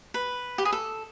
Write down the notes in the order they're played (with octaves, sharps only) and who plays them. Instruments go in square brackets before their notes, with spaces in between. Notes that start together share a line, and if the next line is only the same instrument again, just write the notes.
[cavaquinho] B4
G4
G#4
A4